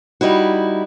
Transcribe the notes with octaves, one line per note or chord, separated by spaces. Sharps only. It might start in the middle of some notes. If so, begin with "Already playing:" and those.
G3 D#4 E4 F#4